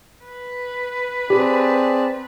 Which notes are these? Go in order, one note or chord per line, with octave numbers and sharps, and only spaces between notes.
B4
C4 G4 G#4 D5 A5